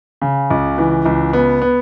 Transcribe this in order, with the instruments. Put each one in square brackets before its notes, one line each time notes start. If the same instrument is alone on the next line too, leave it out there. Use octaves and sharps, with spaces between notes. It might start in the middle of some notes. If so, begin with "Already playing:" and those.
[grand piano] C#3
C#2
E3
C#2
B3
B3